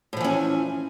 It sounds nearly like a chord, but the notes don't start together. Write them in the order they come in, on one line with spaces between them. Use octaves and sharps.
A2 F3 E3 C#4